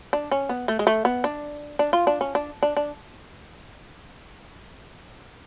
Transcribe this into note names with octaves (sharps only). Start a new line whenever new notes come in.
D4
C#4
B3
A3
G#3
A3
B3
D4
D4
F4
D4
C#4
D4
D4
D4